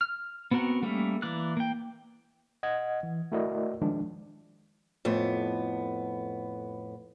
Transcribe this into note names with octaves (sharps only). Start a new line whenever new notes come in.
F6
B3 C4 F#4 A#4 F#5
G3 A3 A#3 C#4
E3 A#3 D5 F#6
A#3 G5
D#5 F#5 G#6
E3
A3 E4 F#4 A#4 D5 D#5
D#3 F3 G#3 D4
F2 A2 B3